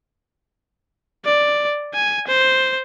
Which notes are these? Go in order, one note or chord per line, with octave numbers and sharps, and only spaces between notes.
D5
G#5
C5